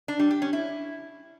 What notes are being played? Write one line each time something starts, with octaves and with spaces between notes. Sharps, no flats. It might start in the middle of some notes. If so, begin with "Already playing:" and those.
D4
G3
G4
C#4
E4